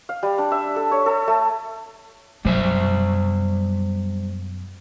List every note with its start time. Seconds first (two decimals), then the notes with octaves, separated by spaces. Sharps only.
0.09 F5
0.23 G3
0.38 D4
0.52 E5
0.76 A4
0.91 C#5
1.06 A4
1.28 A3
2.45 F#2 B2 G3 C5 E5